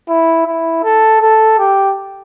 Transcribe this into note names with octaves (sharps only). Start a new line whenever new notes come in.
E4
E4
A4
A4
G4